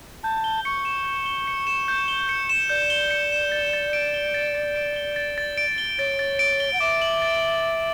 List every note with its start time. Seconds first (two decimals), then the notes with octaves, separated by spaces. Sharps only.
0.23 A5 G6
0.44 G7
0.65 C#6 C#7
0.85 E7
1.05 G6
1.26 G7
1.47 C#7
1.67 E7
1.88 G6
2.08 G7
2.29 C#7
2.49 E7
2.69 D5 G6
2.90 G7
3.11 C#7
3.32 E7
3.52 A6
3.73 A6
3.93 D7
4.14 G7
4.34 A6
4.55 A6
4.76 D7
4.96 G7
5.16 A6
5.38 A6
5.58 D7
5.78 G7
5.99 C#5 A6
6.19 A6
6.39 D7
6.60 G7
6.73 F#5
6.80 E5 D6
7.02 F#7
7.22 A6
7.43 D7
7.63 D6